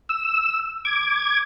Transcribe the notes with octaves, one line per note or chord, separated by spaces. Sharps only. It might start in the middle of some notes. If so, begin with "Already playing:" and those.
E6
D6 G#6